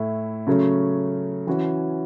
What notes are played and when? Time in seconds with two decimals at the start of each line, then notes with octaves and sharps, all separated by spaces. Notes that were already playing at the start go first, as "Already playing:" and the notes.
Already playing: A2 A3 E4
0.47 C#3 F#3 A3 C#4
1.47 E3 C#4 F#4